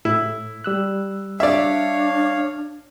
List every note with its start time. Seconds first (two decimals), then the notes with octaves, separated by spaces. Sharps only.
0.05 A2 E4
0.64 G3 E6 F#6
1.40 D4 C#5 D5 E5 F5